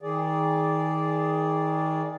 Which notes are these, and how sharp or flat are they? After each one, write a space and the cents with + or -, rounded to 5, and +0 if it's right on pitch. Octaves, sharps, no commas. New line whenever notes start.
D#3 +30 G#4 +0 D5 -10